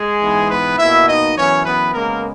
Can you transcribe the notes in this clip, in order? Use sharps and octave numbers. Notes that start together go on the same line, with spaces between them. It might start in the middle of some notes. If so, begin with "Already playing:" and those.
Already playing: G#3 G#4
G#2 E3 B3
B3 B4
B2 A#3 E4 E5
D#4 D#5
F#2 E3 B3 C#4 C#5
B3 B4
C#3 G#3 A#3 B3 A#4